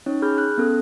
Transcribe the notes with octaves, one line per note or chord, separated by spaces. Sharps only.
C#4 D#4 C#5
G#4 B5 F6 G6
F#6
B3 C#4 A4